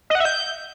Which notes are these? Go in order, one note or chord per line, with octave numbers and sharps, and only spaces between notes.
D#5
F#5
E5
G6